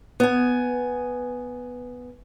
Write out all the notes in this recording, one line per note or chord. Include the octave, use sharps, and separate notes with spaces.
B3 G#5